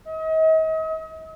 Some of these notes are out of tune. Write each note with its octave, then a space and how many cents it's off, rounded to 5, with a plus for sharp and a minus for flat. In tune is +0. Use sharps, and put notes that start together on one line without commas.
D#5 +40